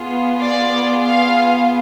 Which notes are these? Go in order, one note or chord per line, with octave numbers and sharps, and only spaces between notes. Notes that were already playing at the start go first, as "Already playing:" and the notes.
Already playing: B3 F4 G#4
D5
F5